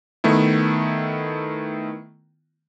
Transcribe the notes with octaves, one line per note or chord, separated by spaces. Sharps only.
D#3 A3 B3 E4